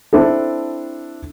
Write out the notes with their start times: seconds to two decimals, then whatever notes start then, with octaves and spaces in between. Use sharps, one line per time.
0.13 C4 D4 E4 A4